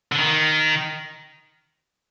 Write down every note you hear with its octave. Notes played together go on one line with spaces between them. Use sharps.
D3
D#3